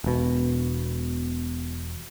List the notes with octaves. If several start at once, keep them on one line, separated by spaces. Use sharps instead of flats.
E1 B2